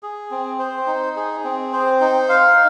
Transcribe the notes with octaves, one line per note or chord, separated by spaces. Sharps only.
G#4
C4
C5
D#4
G#4
C4
C5
D#4
F5